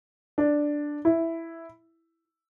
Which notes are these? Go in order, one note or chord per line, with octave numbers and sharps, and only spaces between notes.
D4
E4